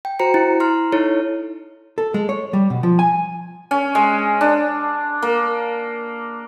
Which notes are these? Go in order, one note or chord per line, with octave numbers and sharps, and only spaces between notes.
G5
F#4 C5 A#5 C#7
E4
A#5 C6 F6
D#4 E4 A4 C#5
A4
G#3
C#5
G3
B2
F3
G#5
C#4
G#3
D4
A#3